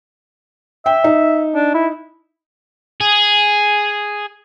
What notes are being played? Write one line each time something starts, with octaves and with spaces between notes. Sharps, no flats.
E5 G5
D#4
D4
E4
G#4